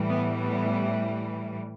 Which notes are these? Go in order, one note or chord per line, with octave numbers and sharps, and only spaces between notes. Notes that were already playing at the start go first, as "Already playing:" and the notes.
Already playing: A2 E3 G3
B3
B3